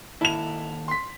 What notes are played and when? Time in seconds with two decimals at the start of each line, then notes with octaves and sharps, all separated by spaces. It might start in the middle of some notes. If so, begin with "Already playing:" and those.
0.21 D#2 E4 A4 F7
0.88 C6 B6